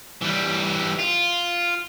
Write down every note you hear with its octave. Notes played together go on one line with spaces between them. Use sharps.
E3 G3
F4